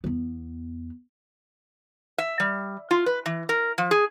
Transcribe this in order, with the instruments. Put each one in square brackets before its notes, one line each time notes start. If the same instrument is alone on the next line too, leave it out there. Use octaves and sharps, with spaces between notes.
[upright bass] E2 B3
[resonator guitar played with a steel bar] E5
G3
F4
B4
E3
A#4
F3
G#4